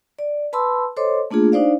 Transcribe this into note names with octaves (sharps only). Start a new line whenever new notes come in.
D5
B4 A5 B5 C6 E6
A4 C5 C#5 D#5 C6 D6
A3 A#3 D4 F4 G#4
D4 D#4 C5 D5 F5